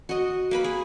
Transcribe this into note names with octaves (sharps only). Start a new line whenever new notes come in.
F#4 D#5
A#3 B4 B5
G#4